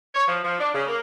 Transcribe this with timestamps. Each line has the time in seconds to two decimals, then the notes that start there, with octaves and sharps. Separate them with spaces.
0.14 C#5
0.27 F3
0.44 F3
0.59 D4
0.74 C#3
0.87 A#3